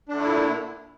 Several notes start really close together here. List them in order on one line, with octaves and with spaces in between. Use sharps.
D4 D3 A3 E4 A#2